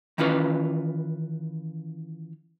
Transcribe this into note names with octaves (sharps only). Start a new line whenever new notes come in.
D#3 E3 C#4 F4 B4